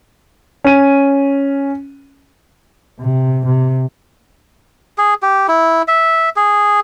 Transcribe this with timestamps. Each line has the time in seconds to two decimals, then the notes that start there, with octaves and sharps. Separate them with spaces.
0.64 C#4 D#7
3.00 C3
3.45 C3
4.98 G#4
5.22 G4
5.48 E4
5.88 E5
6.36 G#4